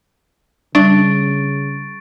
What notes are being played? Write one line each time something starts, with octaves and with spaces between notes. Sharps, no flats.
C#3 G3 D4 C#6 A6 D7